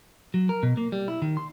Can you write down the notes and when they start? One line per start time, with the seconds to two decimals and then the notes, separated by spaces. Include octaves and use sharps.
0.34 F#3
0.49 A#4
0.63 B2
0.77 A#3
0.92 G3
1.08 E4
1.22 D#3
1.37 C6